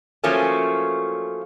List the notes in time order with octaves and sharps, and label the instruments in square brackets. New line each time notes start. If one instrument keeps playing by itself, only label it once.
[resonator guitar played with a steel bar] F3 F#3 A3 A#3 C#4